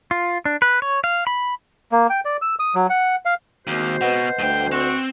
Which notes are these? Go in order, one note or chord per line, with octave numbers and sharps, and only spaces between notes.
F4
D4
B4
C#5
F5
B5
A#3
G5
D5
E6
D#6
F#3
F#5
F5
D#2 G#3 C4 F#4 C5
B2 B4 D#5 F#5
D2 G2 G5
C4 F#4